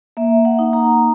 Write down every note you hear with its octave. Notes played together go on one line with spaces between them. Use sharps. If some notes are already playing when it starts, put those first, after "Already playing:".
A#3 E5
F#5
D#4
A#5